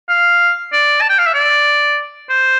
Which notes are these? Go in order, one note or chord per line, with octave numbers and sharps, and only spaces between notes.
F5
D5
A5
G5
F5
E5
D5
C5